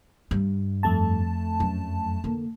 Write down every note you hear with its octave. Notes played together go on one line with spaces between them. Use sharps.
G2 G3
F2 A3 A5
F#2 F#3
D3 A#3